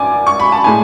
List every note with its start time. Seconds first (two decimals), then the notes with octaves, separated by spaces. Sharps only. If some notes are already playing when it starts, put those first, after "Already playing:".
Already playing: G#1 F#2 D5 G#5 D6
0.27 C#6
0.40 B5
0.52 A5
0.64 A2 G#3 G#5